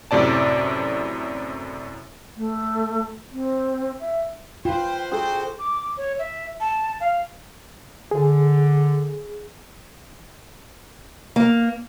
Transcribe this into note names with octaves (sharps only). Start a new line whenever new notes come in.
F#2 A2 C3 D5 A5
A3
C4
E5
F4 B4 C5 G5
D4 F#4 G#4 A4 C5 G5
D6
C#5
E5
A5
F5
D3 G#4
A#3